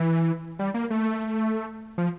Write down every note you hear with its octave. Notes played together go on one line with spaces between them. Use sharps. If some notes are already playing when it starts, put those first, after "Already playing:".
Already playing: E3
G3
A#3
A3
F3